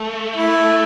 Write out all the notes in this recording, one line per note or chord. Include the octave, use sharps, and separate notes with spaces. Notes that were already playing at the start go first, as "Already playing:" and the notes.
Already playing: A3
E4